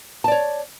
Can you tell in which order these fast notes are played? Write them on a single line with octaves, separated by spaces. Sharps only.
A5 D5 C#5